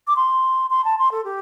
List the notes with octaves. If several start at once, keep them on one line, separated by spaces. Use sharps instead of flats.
D6
C6
C6
A5
C6
A4
G4